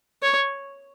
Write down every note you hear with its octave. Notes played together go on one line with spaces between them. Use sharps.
C#5